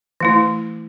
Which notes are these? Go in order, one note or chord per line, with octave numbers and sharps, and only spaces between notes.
E3 A3 E4